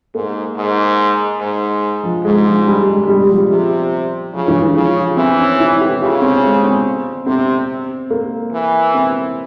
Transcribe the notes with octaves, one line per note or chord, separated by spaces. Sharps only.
G#2 A#3
G#2
G#2
F3
G#2 G#3
F3
G3
G#3
G#3
G3
F3
C3 F3
C#3 F3
E3
E3
C#3 F3
F3
E3 C4
C#4
E4
G4
C#3 F4
C4
G#3
C4
C3 C4
A#3
E3
C4